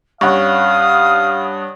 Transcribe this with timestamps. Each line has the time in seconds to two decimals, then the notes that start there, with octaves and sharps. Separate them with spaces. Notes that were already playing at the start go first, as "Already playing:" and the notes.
0.21 G2 C#4 F5 F#5 C#6 D#6